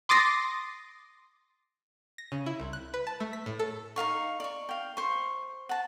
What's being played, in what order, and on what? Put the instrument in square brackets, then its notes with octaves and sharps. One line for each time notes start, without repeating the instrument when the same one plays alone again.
[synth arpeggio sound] C6 D6 D#6 A6 A#6 C7
[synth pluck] A#6
C#3
E4
C2
F#6
B4
A5
A3
B6
A2
A4
[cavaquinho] D#4 C5 F5 C#6
D5 C#6
F5 G5
C5 C#6
F#5 A5